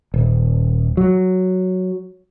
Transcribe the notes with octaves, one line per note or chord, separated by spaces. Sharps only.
D#1
F#3